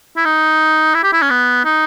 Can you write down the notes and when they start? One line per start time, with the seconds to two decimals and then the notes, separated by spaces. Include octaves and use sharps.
0.17 E4
0.25 D#4
0.95 E4
1.04 G4
1.13 E4
1.22 C#4
1.30 B3
1.65 D#4